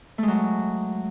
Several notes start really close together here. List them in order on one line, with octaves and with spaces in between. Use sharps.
A3 G#3 F#3